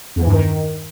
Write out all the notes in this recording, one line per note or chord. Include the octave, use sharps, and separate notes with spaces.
E2
E3
G2
D#3